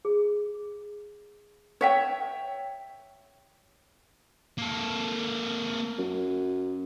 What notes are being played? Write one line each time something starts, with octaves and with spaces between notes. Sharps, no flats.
G#4
C#5 E5 G5
A#3 A4
F#2